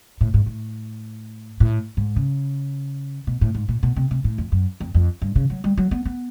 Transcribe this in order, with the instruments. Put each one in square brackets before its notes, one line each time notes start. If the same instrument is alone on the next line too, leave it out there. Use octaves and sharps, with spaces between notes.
[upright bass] A2
G#2
A2
A2
G#2
C#3
B2
A2
G#2
A#2
B2
C3
C3
A2
F2
F#2
F2
F2
G2
C#3
F#3
G3
F#3
B3
B3